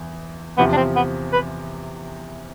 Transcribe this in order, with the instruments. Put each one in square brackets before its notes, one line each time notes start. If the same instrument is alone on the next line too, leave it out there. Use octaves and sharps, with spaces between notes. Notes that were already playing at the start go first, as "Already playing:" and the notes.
Already playing: [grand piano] E2
[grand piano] E2 C3 F3 [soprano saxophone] B3
[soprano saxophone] D4
C4
B3
B4